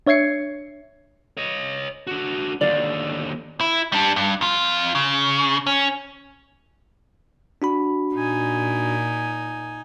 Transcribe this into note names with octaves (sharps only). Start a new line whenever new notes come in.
D4 C#5 E5 G#6 C7 C#7
C#5 D#5
D4 F#4
D#2 D3 D5 F5
E4
G3 D4
G2
F2 F4
C#3
C#4
D4 F#4 B5
A#2 D#4 G#5